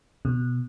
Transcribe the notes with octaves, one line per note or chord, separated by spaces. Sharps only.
B2